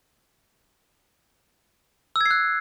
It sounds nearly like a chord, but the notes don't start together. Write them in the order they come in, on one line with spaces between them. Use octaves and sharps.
E6 G#6 C7 F#6